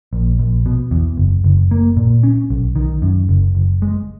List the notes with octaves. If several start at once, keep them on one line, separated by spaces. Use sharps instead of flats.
A#1
A#1
B2
E2
F#1
F#1
A#3
A#2
C#4
B1
D#3
F#2
F#1
F#1
G#3